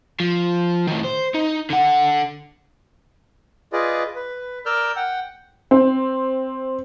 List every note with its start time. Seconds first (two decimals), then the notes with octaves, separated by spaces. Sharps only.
0.20 F3
0.87 A2 D#3
1.04 C5
1.35 D#4
1.70 D3 F#5
3.73 F4 G#4 B4 D5 D#5
4.15 B4
4.66 A#4 D5 E6 F6 G6
4.96 F#5 G5
5.71 C4